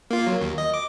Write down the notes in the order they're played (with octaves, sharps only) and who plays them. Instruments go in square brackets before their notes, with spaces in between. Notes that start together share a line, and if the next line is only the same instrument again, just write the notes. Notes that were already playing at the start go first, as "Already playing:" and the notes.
[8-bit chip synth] A#3 F4
F#3
D#2
D#5
D6